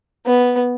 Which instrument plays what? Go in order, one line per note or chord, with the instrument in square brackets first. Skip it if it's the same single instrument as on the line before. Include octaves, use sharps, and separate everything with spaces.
[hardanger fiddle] B3